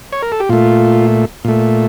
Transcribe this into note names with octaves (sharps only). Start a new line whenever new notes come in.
C#5
A#4
A4
G4
A#2 A3 F4
A#2 A3